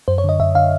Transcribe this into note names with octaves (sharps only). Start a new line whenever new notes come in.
F#2 C5
C#5
D3 D#5
F#2 E5
D3 F5